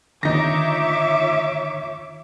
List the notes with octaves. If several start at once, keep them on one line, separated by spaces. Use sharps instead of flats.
D3 D#3 D#4 F4 C#5 E5 D6 A#6